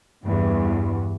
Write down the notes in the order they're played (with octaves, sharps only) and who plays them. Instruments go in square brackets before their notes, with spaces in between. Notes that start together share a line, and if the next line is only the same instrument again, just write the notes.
[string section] E2 G2